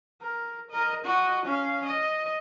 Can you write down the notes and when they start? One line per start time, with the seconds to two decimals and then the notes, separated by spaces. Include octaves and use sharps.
0.21 A#4
0.70 A#4 D#5
1.04 F#4 D#5
1.45 C#4 F5
1.85 D#5